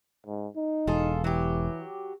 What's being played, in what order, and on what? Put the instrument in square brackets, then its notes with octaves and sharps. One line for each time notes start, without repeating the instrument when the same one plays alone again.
[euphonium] G#2
D#4
[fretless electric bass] E1 [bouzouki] F4 G#4 A4
[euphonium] E3 [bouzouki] F#3 G4